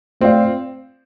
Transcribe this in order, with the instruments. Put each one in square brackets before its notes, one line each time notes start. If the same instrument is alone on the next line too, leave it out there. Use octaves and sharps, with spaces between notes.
[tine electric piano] A3 F4 D5 F5 [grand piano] C4